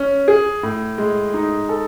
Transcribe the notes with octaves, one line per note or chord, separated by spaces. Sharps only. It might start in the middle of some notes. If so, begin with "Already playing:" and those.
Already playing: C#4
G#4
A2
G#3
D#4
A4